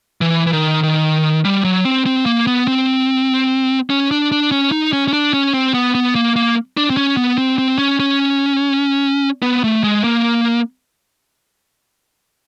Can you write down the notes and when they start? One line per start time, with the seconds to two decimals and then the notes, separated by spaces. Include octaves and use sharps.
0.21 E3
0.47 E3
0.52 D#3
0.83 D#3
1.45 G3
1.64 F#3
1.85 C4
2.06 C4
2.26 A#3
2.47 B3
2.68 C4
3.90 C#4
4.11 D4
4.32 D4
4.51 C#4
4.72 D#4
4.93 C#4
5.08 C#4
5.13 D4
5.33 C#4
5.53 C4
5.74 B3
5.95 B3
6.15 A#3
6.36 A#3
6.77 D4
6.90 C4
6.97 C#4
7.17 B3
7.38 C4
7.58 C4
7.78 C#4
8.00 C#4
9.42 B3
9.64 A3
9.84 G#3
10.04 A#3